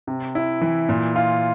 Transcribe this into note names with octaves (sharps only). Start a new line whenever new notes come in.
C3
E4
E3
A#2
F4